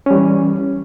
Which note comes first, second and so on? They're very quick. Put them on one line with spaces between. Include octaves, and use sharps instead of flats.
C#4 G3 E3